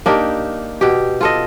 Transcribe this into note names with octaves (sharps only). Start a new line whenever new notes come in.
A#3 D4 D#4 G4
B2 G4
F4 A4 D#5